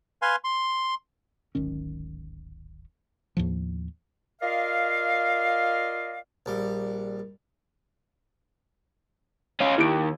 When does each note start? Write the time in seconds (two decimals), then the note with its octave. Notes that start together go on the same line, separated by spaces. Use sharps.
0.22 B4 F5 G#5 C6
0.44 C6
1.55 D1 G#1 D#3 C#4
3.37 D#2 A2 F3
4.42 F4 A#4 D5 D#5 F5
6.46 A#1 G3
9.61 C#4 F4
9.78 D#2 E4 G4 D7